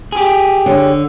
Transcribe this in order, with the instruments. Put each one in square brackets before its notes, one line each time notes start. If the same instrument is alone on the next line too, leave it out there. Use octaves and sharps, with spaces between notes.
[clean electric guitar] G4 G#4
[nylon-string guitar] D3 [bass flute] C#5